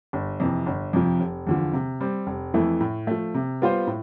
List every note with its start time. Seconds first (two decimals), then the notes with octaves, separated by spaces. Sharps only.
0.13 G1
0.40 F2 C3 E3
0.66 G1
0.93 F2 C3 F3
1.20 F1
1.47 E2 D3 F3
1.73 C3
2.01 G3 C4
2.27 F1
2.54 F2 E3 A3 E4
2.81 A2
3.07 F3 A3
3.34 C3
3.62 G3 B3 F4 C5
3.87 A2